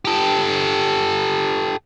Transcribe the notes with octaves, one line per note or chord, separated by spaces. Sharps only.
G4 A4